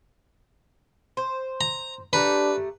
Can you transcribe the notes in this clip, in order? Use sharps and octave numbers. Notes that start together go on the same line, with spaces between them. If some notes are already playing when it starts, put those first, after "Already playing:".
C5
A#5
A3 D4 G4 B4 A#5